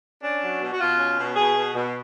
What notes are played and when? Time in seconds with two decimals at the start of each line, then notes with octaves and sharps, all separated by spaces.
0.23 C#4 D4
0.42 F#3
0.61 B2
0.71 F#4
0.80 B2 F4
0.98 C#4
1.18 B2
1.36 B2 G#4
1.55 B2
1.74 B2